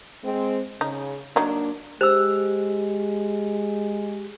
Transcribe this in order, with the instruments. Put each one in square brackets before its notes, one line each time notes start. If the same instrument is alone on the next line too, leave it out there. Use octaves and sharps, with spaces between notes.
[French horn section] G#3 C4
[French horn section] C#3 [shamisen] D#4
[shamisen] F#3 D#4 [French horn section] A#3 D4
[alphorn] G#3 [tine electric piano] G4 [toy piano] C5 E6